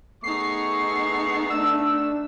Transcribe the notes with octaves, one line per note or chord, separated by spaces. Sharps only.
A3 B3 D#4 G#4 C#6 C7
A3 D4 E6